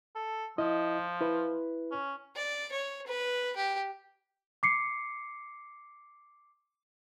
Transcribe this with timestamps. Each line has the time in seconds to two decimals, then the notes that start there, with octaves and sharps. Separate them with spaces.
0.16 A4
0.58 F3 E4 D#5
1.21 E4 B4
1.91 C#4
2.36 D5
2.72 C#5
3.07 B4
3.56 G4
4.63 D6 C7 C#7